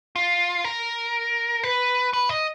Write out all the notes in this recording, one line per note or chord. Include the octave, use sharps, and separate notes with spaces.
F4
A#4
B4
B4
D#5